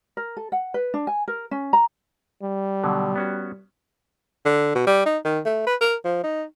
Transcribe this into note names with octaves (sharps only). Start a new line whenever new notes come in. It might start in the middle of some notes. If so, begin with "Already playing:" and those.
A#4
A4
F#5
B4
D4
G#5
A#4
C#4
A#5
G3
B2 D3 F#3
B3 C#4 F#4
D3
B2
G3
D#4
D#3
A3
B4
A#4
F3
D#4